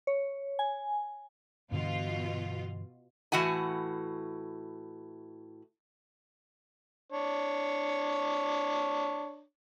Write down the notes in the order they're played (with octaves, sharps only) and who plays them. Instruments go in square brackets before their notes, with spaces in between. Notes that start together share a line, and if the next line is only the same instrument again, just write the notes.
[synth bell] C#5
G#5
[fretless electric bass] G2 D3 E3 [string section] B2 F4
[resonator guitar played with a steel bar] A2 E3 F#4 F#5 G#5
[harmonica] D4 C#5